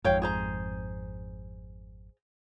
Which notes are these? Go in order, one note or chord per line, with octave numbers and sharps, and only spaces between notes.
G#1 F2 G#2 C#5 F5 G5
G#4 C5 A#5